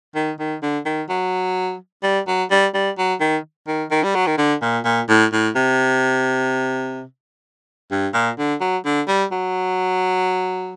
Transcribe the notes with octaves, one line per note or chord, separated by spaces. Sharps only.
D#3
D#3
D3
D#3
F#3
G3
F#3
G3
G3
F#3
D#3
D#3
D#3
G3
F#3
D#3
D3
A#2
A#2
A2
A2
C3
G2
A#2
D3
F#3
D3
G3
F#3